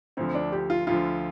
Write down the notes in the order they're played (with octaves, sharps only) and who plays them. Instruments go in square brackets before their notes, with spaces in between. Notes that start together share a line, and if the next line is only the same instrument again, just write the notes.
[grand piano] D2 D3 F3 [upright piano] C4
[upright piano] D4
G4
F4
[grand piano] D2 D3 F3 [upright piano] F4